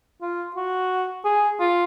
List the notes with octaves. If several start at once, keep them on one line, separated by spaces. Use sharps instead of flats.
F4
F#4
G#4
F4